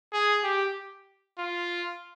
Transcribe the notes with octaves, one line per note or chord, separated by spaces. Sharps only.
G#4
G4
F4